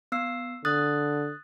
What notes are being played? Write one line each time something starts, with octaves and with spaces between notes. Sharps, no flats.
B3 E6 C7
D3 D#6 F#6 A6